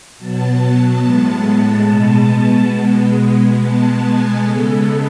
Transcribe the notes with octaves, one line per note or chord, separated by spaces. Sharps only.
B2 F#3 B3 A5
A2 G#3 B3
B2 G#3 B3
B2 G#3 B3
B2 G#3 B3 A5
G#5
C#3 G#3 B3 A4